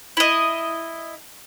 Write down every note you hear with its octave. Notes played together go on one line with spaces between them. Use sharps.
E4 D#5